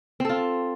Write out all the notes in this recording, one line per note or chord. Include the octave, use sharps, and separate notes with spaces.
C4 F4 A4